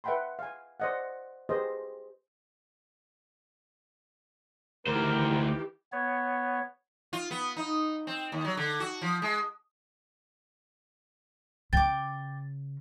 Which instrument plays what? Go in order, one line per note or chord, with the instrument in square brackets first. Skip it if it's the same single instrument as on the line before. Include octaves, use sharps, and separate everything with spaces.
[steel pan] B4 E5 F#5 G5 B5 C6
F5 G#5
C5 D5 D#5 F5 F#5
G4 G#4 B4 C5 D#5
[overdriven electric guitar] D2 C5 [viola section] D#3 E3 G4 [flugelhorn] A#4
[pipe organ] B3 C#5
[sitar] F4
B3
D#4
C4
D#2
F#3
D3
F#4
F3
G#3
[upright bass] C#3 [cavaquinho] G5 D6 [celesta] A6